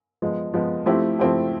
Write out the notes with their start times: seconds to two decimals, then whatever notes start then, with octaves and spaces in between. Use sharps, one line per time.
0.22 F3 G#3 B3
0.53 F3 G#3 B3
0.86 F3 A3 C4 E4 G4
1.19 F3 A3 C4 E4 G4